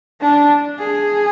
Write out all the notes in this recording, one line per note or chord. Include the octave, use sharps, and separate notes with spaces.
D4
G#4